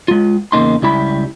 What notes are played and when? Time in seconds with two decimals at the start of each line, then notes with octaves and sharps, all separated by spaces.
0.08 G#3 F4
0.52 E2 C#3 A#3 D#4 C6
0.82 C#2 G3 E4 B5